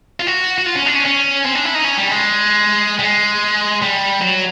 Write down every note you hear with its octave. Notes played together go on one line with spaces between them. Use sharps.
F4
F#4
F#4
F4
C#4
D4
C#4
C#4
C4
D4
E4
D#4
C#4
G3
G#3
G3
G#3
G3
F#3